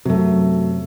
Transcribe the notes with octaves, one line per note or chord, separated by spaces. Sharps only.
F#2 C3 F#3 A3